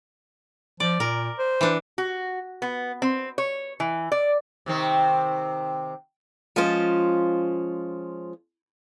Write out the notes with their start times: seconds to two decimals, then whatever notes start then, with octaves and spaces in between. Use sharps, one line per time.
0.80 F3 D5
1.00 A#2 A#4
1.39 C5
1.61 E3 D4
1.98 F#4
2.62 B3
3.02 C4
3.38 C#5
3.80 E3
4.12 D5
4.66 C3 D#3 C4
6.56 F3 G#3 C#4 F4 C5